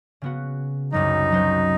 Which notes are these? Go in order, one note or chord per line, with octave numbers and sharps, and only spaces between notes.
C#3 B3 F#4
C2 F#2 F#3 D#4
F#3 F#4 C5